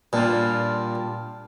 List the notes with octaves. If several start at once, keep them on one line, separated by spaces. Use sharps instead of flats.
A#2 G3 D4 F4